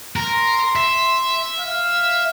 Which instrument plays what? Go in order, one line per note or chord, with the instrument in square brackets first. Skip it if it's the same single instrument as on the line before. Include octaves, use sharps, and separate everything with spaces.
[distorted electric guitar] A#4 [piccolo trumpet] C6
[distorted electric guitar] E5
[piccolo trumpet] F5